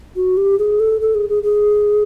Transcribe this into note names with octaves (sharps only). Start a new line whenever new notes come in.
F#4
G4
G#4
A4
A4
G#4
G#4
G#4